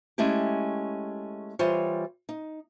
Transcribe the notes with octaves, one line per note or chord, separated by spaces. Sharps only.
G#3 A3 C#4 E4 G4
E3 G3 F4 C5 C#5
D#4